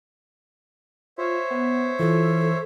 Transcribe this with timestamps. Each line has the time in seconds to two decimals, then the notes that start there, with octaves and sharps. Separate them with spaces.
1.18 F4 C5 C#5 E5
1.50 B3
2.00 E3 F4 A4